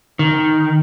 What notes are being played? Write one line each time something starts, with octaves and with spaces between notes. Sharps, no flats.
D#3